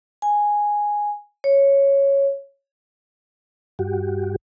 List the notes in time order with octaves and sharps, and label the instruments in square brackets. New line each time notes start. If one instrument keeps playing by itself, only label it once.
[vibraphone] G#5
C#5
[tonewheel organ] G2 F#4 G4